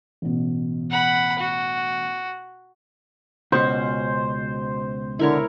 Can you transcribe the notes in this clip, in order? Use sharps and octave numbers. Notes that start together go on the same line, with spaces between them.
A1 B2
F#5 B5
F#4
C#2 B2 C#4 F#4 C5
D3 E4 A#4 C#5